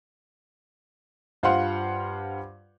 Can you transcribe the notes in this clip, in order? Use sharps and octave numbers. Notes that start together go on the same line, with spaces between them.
G2 F4 C5 F5 F#5 C6